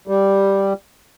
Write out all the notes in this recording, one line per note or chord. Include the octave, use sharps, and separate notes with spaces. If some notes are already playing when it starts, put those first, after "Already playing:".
G3